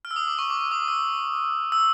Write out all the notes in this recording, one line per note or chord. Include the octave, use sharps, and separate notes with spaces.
F6
E6
D#6
D6
C#6
D6
D6
D#6
E6
E6